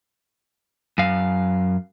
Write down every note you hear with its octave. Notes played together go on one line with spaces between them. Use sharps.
F#2 F5